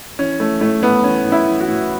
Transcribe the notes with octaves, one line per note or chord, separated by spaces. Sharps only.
E3 C#4
E3 A3
A2 A3
A2 B3
E3 C#4
A2
E4
E3
F#4
A2